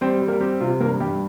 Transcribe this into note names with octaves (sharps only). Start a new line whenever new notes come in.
G3 C4 C5
G3
A#3 A#4
C4 G4
C3 F4
G2 A#3 A#4
G2 G4